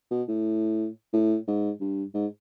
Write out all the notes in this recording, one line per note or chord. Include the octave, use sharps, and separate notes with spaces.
B2
A2
A2
G#2
G2
G#2